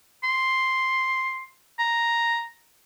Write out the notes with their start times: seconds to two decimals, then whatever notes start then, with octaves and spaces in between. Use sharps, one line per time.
0.24 C6
1.79 A#5